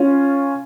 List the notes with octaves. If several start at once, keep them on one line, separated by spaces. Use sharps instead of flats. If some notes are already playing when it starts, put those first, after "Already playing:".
Already playing: C#4 F4